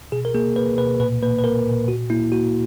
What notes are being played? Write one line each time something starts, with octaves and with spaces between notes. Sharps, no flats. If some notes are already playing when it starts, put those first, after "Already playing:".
B2 G#4
A#4
A#3 G#4
A#3 B4
B2 B4
A#2 B4
A#3 B4
B4
A#3 A#4
A#2
A#2 F#4
A#3 E4
A#3 F#4